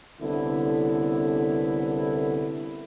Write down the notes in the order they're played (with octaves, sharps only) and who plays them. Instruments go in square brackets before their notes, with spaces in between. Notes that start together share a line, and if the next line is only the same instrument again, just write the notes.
[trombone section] C2 D3 B3 C#4 E4 A4